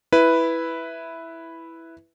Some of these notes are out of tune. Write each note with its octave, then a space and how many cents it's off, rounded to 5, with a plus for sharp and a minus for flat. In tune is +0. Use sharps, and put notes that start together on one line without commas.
E4 +0 B4 +0